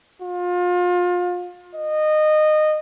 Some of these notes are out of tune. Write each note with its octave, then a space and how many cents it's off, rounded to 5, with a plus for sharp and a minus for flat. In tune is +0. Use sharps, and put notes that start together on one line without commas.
F4 +30
D#5 -20